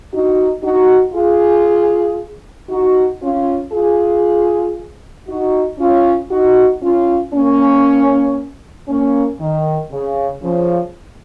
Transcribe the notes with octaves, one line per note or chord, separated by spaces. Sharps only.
D#4 F#4
D#4 F#4
F4 G#4
D#4 F#4
C#4 F4
F4 G#4
D#4 F#4
C#4 F4
D#4 F#4
C#4 F4
A#3 C#4
A#3 C#4
D#3
C#3
C#3 F3